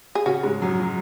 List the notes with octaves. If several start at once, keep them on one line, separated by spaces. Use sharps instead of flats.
G#4
C#3 C#4 F#4
G#2 G#3
F#2 F#3
F#3